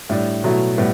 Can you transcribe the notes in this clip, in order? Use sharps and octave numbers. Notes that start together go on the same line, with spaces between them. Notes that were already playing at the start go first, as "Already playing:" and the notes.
A2 G3 D4
B2 F#3 A3 E4
A2 G3 B3